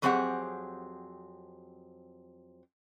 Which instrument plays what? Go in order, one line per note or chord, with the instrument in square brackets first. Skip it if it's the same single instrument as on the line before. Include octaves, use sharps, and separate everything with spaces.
[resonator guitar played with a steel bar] F2 F#3 C4 G4 G#4 F#5